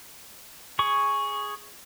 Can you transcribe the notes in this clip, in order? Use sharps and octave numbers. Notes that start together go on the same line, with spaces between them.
G#4 C#6